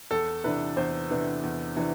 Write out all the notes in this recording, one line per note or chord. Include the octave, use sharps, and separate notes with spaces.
E2 A4
C3 E3 B3 D4 B4
E2 C5
C3 E3 B3 D4
E2
C3 E3 B3 D4